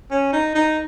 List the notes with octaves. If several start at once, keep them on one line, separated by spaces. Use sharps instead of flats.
C#4
D#4
D#4